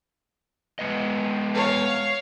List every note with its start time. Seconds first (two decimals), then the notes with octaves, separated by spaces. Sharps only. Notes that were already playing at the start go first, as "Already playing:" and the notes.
0.79 G#3 B3 D#5
1.54 C#5 F5